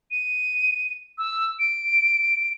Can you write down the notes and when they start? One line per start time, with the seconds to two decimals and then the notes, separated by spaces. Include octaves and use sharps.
0.11 D#7
1.18 E6
1.59 D7